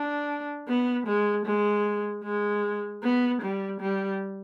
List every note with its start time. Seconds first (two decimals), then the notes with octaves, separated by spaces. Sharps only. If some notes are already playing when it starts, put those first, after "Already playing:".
Already playing: D4
0.68 B3
1.07 G#3
1.46 G#3
2.24 G#3
3.03 B3
3.42 G3
3.81 G3